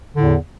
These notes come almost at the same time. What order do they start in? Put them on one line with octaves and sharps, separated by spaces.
D3 A2 E2